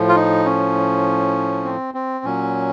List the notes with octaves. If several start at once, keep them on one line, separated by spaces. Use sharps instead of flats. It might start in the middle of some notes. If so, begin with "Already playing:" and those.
Already playing: A2 F3
F4
D#4
C#4
C4
C4
A#2 F#3 C#4